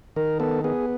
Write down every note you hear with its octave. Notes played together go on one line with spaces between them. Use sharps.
D#3 A#4
B3 A4
B3 G#4